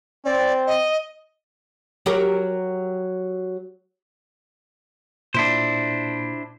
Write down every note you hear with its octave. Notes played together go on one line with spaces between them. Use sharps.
C4 D5
D#5
F#3 G4 A#4
A#2 D4 E4 C5